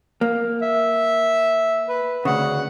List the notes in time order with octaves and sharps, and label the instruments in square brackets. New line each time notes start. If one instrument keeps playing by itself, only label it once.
[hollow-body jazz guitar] A#3
[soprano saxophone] E5
B4
[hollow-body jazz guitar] D2 C#3 [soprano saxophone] F#5